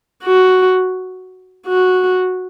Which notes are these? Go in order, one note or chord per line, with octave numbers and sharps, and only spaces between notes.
F#4
F#4